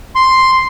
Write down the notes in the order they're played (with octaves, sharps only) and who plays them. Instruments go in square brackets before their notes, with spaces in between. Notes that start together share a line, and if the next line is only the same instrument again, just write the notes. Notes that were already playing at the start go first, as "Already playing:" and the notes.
[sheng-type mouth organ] C6